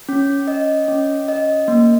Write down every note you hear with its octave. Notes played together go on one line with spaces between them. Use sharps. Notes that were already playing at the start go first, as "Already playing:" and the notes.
C#4
D#5
C#4
D#5
A#3